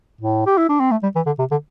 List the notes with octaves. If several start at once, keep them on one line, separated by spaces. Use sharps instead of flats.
A2
G4
E4
D4
C4
A3
G3
E3
D3
C3
D3